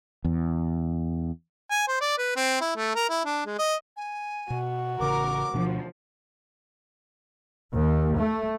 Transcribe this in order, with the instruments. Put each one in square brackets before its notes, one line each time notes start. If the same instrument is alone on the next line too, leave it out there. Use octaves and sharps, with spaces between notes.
[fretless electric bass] E2
[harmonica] G#5
C5
D5
B4
C4
E4
A3
A#4
E4
D4
G#3
D#5
[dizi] G#5
[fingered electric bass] B2 [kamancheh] F#4
[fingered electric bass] A1 C#3 [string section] A#4 [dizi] D6
[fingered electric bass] D2 B2 D4 [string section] F3
[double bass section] D#2
A3